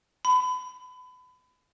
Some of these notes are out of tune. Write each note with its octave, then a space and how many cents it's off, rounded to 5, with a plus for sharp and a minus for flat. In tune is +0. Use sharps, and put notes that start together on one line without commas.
B5 +30